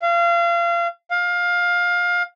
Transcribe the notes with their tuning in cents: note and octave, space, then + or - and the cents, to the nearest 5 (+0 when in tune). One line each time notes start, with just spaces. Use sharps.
F5 -30
F5 +20